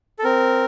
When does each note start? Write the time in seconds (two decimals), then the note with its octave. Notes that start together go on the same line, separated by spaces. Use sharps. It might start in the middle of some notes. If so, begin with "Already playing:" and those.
0.19 A4
0.24 C4 A#4